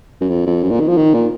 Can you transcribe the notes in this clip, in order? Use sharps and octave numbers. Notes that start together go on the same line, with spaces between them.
F#2
F2
F2
F#2
A#2
D#3
F3
D#3
A#2